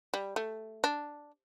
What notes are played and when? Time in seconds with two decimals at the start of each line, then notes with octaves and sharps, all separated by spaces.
0.14 G3
0.36 A3
0.84 D4